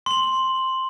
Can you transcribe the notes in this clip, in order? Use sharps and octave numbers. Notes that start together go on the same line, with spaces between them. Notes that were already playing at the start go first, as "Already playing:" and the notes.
C6 F#7